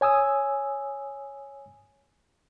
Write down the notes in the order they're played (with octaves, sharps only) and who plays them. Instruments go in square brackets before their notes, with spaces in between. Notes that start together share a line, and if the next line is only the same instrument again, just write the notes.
[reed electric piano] C#5 G#5 D#6 E6